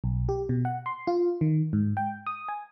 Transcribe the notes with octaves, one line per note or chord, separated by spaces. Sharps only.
B1
G4
B2
F#5
C6
F4
D#3
G#2
G5
D#6
G#5